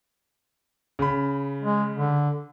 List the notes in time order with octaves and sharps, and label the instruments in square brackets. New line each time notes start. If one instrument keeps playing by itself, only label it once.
[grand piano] C#3 B5
[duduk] G#3
D3